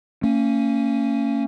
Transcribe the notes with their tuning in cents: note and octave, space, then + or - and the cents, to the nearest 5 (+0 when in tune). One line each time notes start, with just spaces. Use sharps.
A#3 -45 C#4 +0